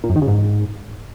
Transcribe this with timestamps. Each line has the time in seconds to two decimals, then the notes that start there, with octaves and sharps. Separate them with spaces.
0.04 A#2
0.10 F#2
0.16 D#3
0.22 C#3
0.28 G#2